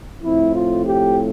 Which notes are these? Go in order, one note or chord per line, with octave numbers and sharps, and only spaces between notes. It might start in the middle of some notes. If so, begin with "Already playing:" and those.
A2 F3 A3 C4 E4
F4
G4